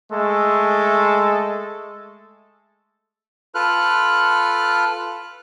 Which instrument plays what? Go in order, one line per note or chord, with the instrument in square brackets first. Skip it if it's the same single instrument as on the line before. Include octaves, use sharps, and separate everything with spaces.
[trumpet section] G#3 A3 A4
[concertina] F4 A4 B4 F6 F#6